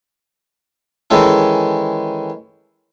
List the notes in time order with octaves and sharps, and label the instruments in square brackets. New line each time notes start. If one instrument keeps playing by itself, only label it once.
[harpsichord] D#3 E3 G#3 C#4 A4